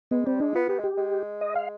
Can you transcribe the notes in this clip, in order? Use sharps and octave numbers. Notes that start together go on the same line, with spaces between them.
G#3 B3
G3 C4
G#3 D4
B3 F4
B3 G4
G#3
G4
G#3
D#5
F5